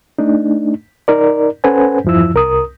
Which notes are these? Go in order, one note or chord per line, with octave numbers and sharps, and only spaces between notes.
A3 D4 D#4
D#4 A#4 D5
C#4 A4 B4 C5 F#5 G#5
E2 G2 F3 E4 E6
C2 A#4 D#6